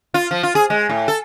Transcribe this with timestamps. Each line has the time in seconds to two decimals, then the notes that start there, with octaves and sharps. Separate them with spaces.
0.14 F4
0.31 F3
0.43 F4
0.55 G#4
0.70 G#3
0.89 A2
1.08 A4